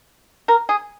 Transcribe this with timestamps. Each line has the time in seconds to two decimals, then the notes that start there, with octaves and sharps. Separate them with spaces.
0.48 A#4
0.69 G#4